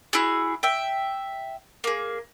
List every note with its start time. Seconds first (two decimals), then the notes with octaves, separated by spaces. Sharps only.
0.13 E4 F#4 G#4
0.63 E5 G5
1.84 A#3 G#4